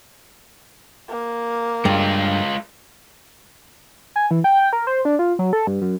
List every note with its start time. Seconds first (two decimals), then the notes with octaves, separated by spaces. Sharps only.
1.09 A#3
1.85 G2 G#3 F4
4.16 G#5
4.31 E3
4.44 G5
4.59 G5
4.73 A#4
4.87 C5
5.05 D4
5.19 F4
5.39 F#3
5.53 A4
5.67 G2
5.81 F#2